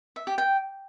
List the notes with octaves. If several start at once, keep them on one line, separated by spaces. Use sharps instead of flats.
E5
G4
G5